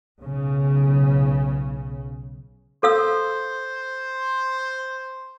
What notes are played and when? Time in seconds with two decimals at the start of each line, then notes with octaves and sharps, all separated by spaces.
0.21 B1 C#3
2.83 A4 C5 F5 E6